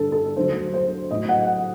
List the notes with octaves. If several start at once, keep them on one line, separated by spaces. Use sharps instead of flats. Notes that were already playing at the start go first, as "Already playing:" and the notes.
Already playing: G2 D3 G3 A4
A4
D2 D3 F#3 C5
C5
A2 F#3 D#5
F#5
F#5